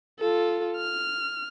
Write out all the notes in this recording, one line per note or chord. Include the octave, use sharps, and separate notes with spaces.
F4 A4
F6